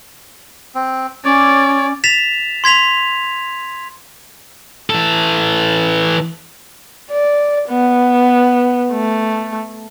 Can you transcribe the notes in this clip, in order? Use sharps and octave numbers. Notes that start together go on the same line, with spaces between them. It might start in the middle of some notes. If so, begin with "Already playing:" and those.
C4
C#4 C#5 D5
A6 B6 E7 F7
C6 G#6 B6 F7
E3 A4
D5
B3
A3